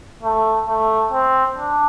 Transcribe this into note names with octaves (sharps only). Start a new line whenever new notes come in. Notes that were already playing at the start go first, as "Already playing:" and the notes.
A3
A3
C4
D4